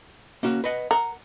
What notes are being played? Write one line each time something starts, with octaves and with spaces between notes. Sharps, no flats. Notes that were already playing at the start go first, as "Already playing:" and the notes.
A#3 C#4 F#4
B4 D#5 F#5
A#4 F#5